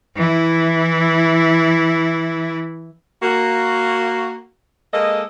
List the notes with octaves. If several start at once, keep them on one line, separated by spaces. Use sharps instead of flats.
E3 E4
A#3 F#4
G#3 A#3 A4 D#5